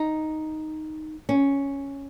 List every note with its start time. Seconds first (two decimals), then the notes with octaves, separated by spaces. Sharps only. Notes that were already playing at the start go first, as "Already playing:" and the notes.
Already playing: D#4
1.29 C#4